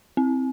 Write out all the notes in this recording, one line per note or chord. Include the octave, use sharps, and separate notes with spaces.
C4